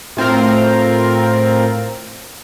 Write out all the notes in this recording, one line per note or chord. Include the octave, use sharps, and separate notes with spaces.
A2 C4 F4 A#4